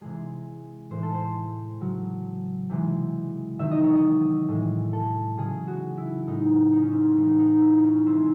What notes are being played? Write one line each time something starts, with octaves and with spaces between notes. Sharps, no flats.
C3 E3 G#3 G#4
A2 E3 G#3 C5
A4
C5
C#3 F#3
C3 E3 G#3
C3 D#3 F#3 E5
D#5
C#5
D#5
A2 E3 G#3
A4
C#3 F#3 G#4
F#4
E4
A2 G#3 D#4
D#4
C#4
C4
C#4
A2 E3 G#3 D#4
D#4
E4
D#4
C#4
C3 E3 G#3 C4